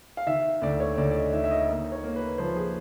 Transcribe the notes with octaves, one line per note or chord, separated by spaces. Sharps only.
F5
D#3 E5
D2 D5
C#5
D2 D5
D5
D#5
D#3 E5
E5
D#5
A#3
C#5
A#3
B4
F3 C5
G#4